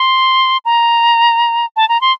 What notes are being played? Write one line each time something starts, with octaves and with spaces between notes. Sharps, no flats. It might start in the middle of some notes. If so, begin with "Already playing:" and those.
Already playing: C6
A#5
A5
A#5
C6